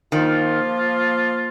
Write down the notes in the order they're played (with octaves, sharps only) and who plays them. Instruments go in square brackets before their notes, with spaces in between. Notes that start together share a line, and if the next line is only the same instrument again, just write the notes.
[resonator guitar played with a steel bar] D#3 [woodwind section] F3 A#3 F4